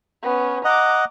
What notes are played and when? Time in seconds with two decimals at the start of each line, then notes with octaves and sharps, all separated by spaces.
0.23 B3 C#4
0.65 D#5 F#5 A#5 D6